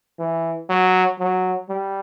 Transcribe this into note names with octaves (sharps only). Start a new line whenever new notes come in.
E3
F#3
F#3
G3